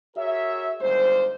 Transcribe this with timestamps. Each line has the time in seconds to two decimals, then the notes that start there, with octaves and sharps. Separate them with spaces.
0.16 F#4 G#4 A#4 C#5 E5
0.80 G1 D#2 G3 G#3 C5